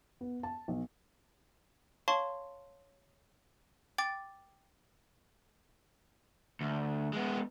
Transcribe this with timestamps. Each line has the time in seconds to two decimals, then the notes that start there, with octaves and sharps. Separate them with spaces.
0.21 B3
0.43 A5
0.68 B1
2.08 C#5 F5 A5 C6 C#6
3.98 G5 D6 A6
6.61 D2
7.13 G#3 B3